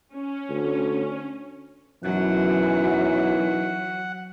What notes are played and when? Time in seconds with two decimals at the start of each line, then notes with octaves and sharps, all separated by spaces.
0.14 C#4
0.49 D2
2.04 F#2 B2 E3 F#3 D#4 F#5